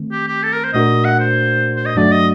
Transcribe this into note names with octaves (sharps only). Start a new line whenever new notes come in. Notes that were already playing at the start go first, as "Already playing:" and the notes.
Already playing: D#3 A3 C4
G4
G4
A4
A#4
C5
A#2 A3 D4 F#4 A#4 D#5
F#5
C5
C5
D#5
G2 F#3 A3 D4 F#4 D5
D#5